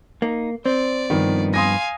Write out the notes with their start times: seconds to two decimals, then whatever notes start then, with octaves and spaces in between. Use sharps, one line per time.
0.22 A#3 D#4
0.66 C4 C5 D5
1.10 G2 D#3 F3 B3
1.54 F5 G#5 C6 D#6 A#6